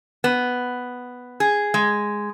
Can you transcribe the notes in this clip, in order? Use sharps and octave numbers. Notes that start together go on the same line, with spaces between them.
B3
G#4
G#3